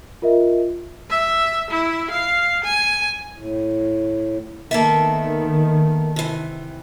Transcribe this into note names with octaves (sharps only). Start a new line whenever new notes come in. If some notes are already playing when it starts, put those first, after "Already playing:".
F4 A#4 D#5 E5
E5
E4
F5
G#5
A2
D#3 A#3 B3 A4 E5 A5
C3 E3